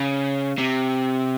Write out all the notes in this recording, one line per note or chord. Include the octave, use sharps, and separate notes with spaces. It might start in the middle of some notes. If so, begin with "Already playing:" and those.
Already playing: C#3
C3